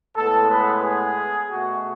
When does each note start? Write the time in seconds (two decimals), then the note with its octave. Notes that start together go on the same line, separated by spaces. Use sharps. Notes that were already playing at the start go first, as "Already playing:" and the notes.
0.16 A2 G#3 B3 A4
0.50 B4
0.84 G#4
1.51 B2 A3 F#4